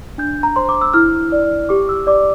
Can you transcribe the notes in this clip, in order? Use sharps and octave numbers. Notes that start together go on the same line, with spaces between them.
D4 G6
A#5
C5 C6
D6
E6
E4 F6
D5
G4 D6
E6
D5 D6